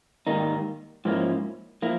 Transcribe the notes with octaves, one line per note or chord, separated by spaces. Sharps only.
G#2 D#3 G3 A#3 D#4
G#2 F3 A#3 C#4 E4
F3 A#3 E4